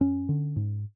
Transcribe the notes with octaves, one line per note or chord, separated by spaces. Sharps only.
F#2 C#4
D3
G#2